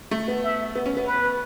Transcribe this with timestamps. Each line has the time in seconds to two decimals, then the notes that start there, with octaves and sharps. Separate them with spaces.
0.11 A3
0.28 B3
0.43 E5
0.75 B3
0.86 C#4
0.97 B3
1.07 B4